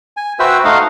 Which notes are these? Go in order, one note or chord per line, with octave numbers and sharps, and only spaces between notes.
G#5
F#4 B4 C5 E5 G5 E6
A3 D#4 D#5 F5 F#5